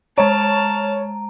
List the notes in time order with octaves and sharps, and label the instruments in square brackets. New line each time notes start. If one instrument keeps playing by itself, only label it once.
[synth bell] G#3 A#5 [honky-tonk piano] C#5 [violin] A5 F6